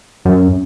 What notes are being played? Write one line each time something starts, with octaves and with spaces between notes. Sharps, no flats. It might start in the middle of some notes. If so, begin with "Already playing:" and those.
F#2